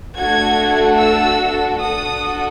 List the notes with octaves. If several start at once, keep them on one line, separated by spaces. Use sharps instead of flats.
A3 D4 F#4 A4 G#6
E6
D4 F#4 A4 D#6